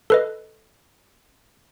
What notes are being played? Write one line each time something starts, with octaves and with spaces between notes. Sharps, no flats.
A4 B4 D#5